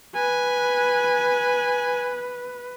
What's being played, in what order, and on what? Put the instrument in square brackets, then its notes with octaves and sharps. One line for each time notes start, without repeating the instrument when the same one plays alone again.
[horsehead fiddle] B4 [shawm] G#5